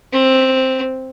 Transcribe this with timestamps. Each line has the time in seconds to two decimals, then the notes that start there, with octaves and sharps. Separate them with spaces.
0.13 C4